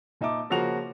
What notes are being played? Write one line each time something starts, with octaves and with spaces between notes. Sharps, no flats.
A#2 D#4 E5 A5 D6
C#3 F3 A#3 F#4 F7